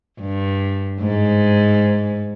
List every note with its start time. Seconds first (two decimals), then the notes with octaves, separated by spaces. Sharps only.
0.20 G2
1.00 G#2